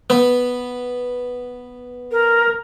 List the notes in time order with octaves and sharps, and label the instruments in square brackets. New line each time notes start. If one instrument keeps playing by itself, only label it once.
[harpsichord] B3
[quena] A#4